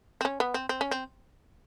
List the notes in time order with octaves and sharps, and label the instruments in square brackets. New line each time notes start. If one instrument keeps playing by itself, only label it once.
[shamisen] C4
C#4
B3
C4
C4
C#4
C4